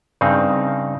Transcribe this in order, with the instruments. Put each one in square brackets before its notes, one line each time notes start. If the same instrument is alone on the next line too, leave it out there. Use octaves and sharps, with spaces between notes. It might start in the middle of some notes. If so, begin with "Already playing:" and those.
[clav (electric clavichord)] G2 C#3 C4 D#4